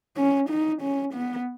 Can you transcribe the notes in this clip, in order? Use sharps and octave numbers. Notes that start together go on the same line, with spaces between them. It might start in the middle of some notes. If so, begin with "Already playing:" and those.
C#4
D#4
C#4
B3